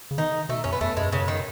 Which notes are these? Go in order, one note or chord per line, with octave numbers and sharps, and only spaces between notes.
C#3
D#3 D#4
B2 A3
F#2 C#4
B3
E2 A3
F#2 G#3
C#3
D#3